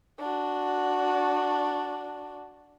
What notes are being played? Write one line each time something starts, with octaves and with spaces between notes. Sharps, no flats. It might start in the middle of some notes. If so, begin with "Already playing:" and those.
D4 F#4